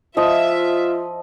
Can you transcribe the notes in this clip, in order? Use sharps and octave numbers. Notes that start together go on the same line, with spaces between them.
F3 F4 D#5 E5